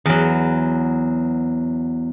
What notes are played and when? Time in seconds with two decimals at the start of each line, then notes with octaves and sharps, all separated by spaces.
0.05 E2 F#3